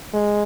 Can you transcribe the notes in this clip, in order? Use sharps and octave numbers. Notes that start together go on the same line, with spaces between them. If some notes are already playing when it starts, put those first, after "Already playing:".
G#3